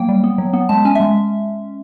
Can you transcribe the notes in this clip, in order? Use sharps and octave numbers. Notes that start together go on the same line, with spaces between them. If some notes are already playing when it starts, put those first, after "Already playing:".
Already playing: F#3 A#3 G5
G3
B3
F#3
B3
G#3 A5
C#4 G#5
E5
G#3